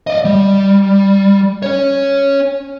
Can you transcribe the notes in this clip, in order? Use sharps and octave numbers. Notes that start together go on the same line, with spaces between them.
D5 D#5
G3
C#4 C#5